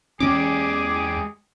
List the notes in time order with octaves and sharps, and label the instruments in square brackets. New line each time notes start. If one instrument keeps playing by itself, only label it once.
[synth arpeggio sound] E2 D6 [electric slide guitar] G#3 G4 [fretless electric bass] C#4 [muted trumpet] G#4